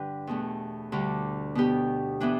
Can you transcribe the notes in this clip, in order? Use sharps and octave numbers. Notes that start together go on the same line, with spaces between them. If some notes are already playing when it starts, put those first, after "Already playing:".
Already playing: G2 D3 G3 D4 G4 B4
E2 B2 A3
D2 D3 G3
B2 B3 G4
E3 B3 D4